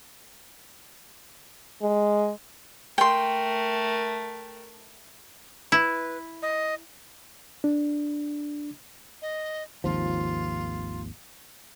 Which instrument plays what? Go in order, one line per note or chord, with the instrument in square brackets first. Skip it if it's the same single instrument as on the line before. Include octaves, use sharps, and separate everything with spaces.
[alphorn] G#3
[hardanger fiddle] A3 A#4 [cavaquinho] G5 C6
[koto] E4 [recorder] B4
[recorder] D#5
[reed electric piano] D4
[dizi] D#5
[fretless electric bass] G#1 D#2 F3 [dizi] F4